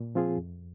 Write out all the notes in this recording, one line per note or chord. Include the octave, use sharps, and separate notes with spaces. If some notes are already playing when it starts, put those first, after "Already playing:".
Already playing: A#2
F3 C4 F4 G#4
F2